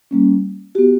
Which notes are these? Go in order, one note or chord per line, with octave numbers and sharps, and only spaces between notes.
G3 A#3 C#4
B3 F#4 G4